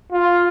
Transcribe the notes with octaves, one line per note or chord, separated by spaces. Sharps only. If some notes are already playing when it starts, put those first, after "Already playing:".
F4